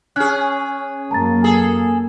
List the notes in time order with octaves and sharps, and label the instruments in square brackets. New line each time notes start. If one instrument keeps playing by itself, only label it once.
[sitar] C#4 G#4 [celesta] F#6
[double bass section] F#2 A#3 [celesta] A5 A#5 A6
[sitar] G#4 A4